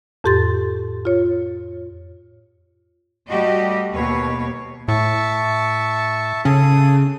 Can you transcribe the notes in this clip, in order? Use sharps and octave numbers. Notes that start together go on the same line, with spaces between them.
F2 A2 G4 C6 A6
F4 C#5
G3 A3 F#4 G4 D#5
D#2 B2 B4 C#5
A2 E5 A5 C#6
C#3 C#4 G#4 A4 D#6